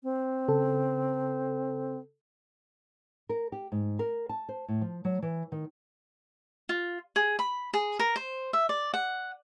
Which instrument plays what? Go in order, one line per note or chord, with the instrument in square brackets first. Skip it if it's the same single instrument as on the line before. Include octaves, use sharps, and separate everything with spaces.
[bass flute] C4
[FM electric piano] C#3 A4
[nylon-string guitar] A#4
G4
G#2
A#4
A5
C5
A2
F3
F#3
E3
D#3
[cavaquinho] F4
G#4
B5
G#4
A#4
C5
E5
D5
F#5